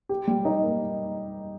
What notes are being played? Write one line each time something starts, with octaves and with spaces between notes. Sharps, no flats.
G4
G3
D#4
A#3